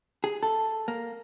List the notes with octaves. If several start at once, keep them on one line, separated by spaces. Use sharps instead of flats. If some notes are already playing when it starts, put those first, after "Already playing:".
G#4
A4
A#3